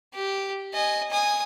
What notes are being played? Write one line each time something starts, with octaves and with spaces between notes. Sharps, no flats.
G4
D#5 G#5
G#5 D#6